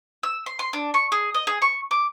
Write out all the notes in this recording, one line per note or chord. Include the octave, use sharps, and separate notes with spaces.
E6
C6
C6
D4
C#6
G#4
D#5
G#4
C#6
D6